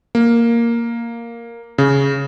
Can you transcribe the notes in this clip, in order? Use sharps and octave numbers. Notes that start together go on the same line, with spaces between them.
A#3
C#3